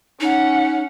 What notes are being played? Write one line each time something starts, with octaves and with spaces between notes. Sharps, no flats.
C#4 D#4 F#5